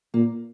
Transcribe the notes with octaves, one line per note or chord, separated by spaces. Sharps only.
A#2 A#3